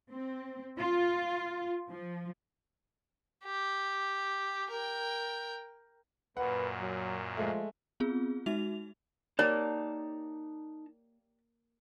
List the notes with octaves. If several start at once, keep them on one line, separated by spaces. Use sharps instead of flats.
C4
F4
F3
G4
A#4 G5
F#2 A#2 B4 F#5
F#3
F3 G#3 A3
B3 C4 F4 G#4
G#3 D#4 F#4 E5 F7
A#3 D#4 G4 C#5 D5 A5 A#5